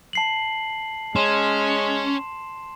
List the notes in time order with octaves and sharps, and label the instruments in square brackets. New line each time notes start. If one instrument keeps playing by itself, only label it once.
[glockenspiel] A5 C7 F#7
[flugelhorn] G#3 [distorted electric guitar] C#4 [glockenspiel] C6 E7